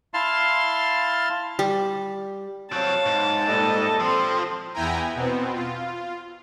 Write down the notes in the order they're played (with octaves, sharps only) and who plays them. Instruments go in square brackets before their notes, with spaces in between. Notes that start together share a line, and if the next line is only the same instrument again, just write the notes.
[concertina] E4 F5 A5 C6 F6
[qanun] G3
[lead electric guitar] F#3 C4 [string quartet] C#5 F5 [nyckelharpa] A5
[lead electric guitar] G#2
[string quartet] A#2 G3 D#5 [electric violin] A4
[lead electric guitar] F3 [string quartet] C4 C6
[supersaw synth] E2 B3 E4 G5 G#5 A#5
B2 B3 C4
F4